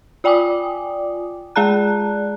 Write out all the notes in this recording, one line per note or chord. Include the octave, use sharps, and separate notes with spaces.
F4 D5 G5 G#5 D6 D#6
G#3 G#4 D5 A5 A#5 F#6